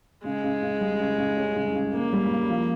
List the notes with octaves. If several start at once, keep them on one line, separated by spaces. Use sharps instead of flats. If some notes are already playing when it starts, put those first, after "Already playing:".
C#3 G#3
C#3
C#3
G3
C#3
C#3
C#4
C#3
C#3
C#3 A#3
G3
C#3
F3